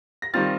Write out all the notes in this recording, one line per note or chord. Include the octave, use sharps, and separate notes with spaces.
A#6
D#3 G3 C4 F4 A6